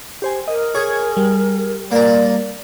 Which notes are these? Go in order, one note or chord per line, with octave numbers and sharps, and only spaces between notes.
G4 C5 G#5
A#4 D#5
G#4 C#5 G#6
G3
A#3 A#4 D5